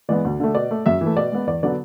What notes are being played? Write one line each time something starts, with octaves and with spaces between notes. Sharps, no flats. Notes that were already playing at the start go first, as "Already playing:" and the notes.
E3 G#3 B3 D5
D2
D3 A3
B2 D5
A3
F#2 E5
E3
A3
B2 D5
G#3 B3
E2 D5
D3 F#3 B3 D5